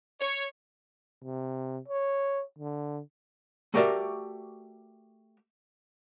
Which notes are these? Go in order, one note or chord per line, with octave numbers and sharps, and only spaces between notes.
C#5
C3
C#5
D3
A3 F#4 G4 A#4 D5 E5